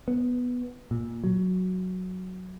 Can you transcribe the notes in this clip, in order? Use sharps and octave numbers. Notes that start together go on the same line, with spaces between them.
B3
A#2
F#3